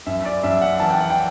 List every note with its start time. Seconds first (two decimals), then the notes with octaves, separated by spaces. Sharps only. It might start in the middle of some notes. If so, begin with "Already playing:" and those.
0.06 F#2 E5
0.25 D5
0.43 F#2 E5
0.62 F#5
0.79 E3 A5
0.90 G5
1.01 F#5
1.10 G5